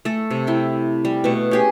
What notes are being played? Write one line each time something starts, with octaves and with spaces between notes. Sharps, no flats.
A3 A4
C3
E4 G5
G3
B2 A3
C#4 G4 G#4